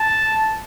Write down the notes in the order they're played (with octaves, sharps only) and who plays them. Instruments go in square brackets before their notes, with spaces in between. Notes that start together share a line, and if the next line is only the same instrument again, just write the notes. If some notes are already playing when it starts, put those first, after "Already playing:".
Already playing: [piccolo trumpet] A5